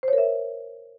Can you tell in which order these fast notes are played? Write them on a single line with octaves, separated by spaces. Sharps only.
C5 C#5 A#4 E5